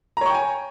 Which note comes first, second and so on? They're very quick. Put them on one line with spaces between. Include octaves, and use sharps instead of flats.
A#5 C#5 C#6 G5 G#5